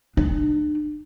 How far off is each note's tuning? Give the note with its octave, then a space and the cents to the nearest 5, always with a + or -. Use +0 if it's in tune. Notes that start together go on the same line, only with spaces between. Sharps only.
D4 +40